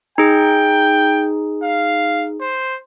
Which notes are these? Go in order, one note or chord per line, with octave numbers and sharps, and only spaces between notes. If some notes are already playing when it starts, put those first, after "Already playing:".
D#4 G#4 G5
F5
C5